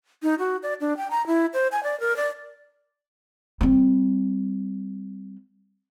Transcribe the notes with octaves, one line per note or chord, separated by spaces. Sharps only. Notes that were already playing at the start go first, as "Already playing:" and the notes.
D#4
F#4
D5
D4
G5
A#5
E4
C5
G#5
D5
A#4
D5
G3 C4